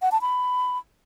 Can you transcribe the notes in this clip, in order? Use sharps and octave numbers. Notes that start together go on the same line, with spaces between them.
F#5
A5
B5